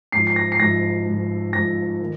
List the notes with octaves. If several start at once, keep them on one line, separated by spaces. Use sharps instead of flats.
G#2 F3 C7
C7
A#6
C7
G#2 F3 A#6
G#2 F3
G#2 F3 A#6
D#3